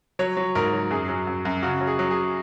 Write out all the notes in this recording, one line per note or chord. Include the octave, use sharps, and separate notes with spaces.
F#3 C#5
F#3
G#2 A#4
F#3
F#2 G#4
F#3
F#2
F#2
C#3 F#4
F#3
G#4
F#3
G#4